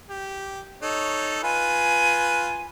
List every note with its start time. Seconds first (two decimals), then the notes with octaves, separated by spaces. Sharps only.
0.09 G4
0.82 D#4 A4 C#5
1.43 F4 B4 G#5